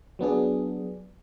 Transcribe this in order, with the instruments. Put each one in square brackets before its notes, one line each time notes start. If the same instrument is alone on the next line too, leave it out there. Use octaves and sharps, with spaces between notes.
[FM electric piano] F#3 B3 D4 G#4